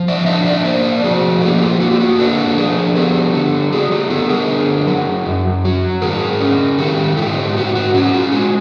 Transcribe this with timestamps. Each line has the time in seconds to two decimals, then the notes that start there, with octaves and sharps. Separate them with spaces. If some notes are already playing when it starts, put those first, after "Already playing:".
Already playing: F3
0.08 D5 E5
0.26 D4 D#5 F5
0.45 D5 E5
0.65 A#3 C5 D5
1.04 F3 F#4 G#4
1.41 A#3 G4 A4
1.61 F4
1.80 A#3 F#4
1.91 G4
2.00 F#4
2.19 D4 A4 B4
2.57 F3 G#4 A#4
2.96 B3 G4 A4
3.33 D3
3.72 F#3 F#4 G#4
3.91 F4 G4
4.10 B3 G4 A4
4.29 G#4 A#4
4.48 D3
4.87 F#3
5.25 F#2
5.65 F#3
6.02 G#2 G#4 A#4
6.40 C#4
6.79 D#3 G4 A4
7.17 G#2 F4 G4
7.56 G#2 F#4
7.75 F#4
7.94 C#4 F#4
8.14 F4
8.32 G#3 F#4